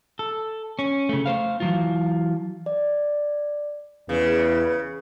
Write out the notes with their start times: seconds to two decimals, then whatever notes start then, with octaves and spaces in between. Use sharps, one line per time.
0.19 A4
0.79 C#4
1.09 C#3 A3
1.26 A3 C5 F5
1.60 E3 F#3 F4
2.66 D5
4.09 E2 C#3 B4